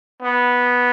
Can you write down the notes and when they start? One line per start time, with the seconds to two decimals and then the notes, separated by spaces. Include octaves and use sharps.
0.22 B3